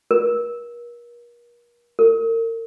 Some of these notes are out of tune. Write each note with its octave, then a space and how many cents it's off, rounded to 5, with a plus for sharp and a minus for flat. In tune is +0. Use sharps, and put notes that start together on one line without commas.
A#4 +40
A#4 -40